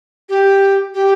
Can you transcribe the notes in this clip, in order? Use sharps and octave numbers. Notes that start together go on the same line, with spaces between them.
G4
G4